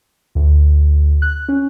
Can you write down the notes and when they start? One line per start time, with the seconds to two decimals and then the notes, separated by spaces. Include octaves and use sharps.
0.35 D2
1.22 F#6
1.49 C#4